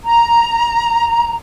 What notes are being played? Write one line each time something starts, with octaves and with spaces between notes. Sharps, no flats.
A#5